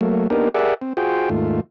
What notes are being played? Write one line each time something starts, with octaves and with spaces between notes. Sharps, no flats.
F#3 A3 A#3
A#3 B3 D4 D#4 G4 A#4
G4 G#4 A#4 D5 E5 F#5
C4
F4 F#4 G#4 C5 G5
D#2 G#2 A3 F4